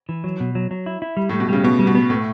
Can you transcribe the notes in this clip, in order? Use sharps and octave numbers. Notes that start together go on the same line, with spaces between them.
E3
F#3
B2
F#3
F#3
E4
E4
G3
A2 G3
B2
C#3 G3
B2 B3
G3
B2
B3
A2 A3